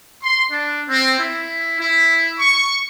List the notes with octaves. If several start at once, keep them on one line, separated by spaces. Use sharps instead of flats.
C6
D4
C4
E4
E4
C#6